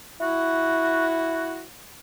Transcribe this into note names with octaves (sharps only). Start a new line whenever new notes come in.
E4 F#4